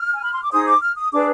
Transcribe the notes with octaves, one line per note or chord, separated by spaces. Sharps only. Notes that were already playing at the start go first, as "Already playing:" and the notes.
Already playing: F6
G#5
B5
C6
D6
D#4 G#4 C5 D#6
D6
F6
D#6
D4 G#4 B4 D6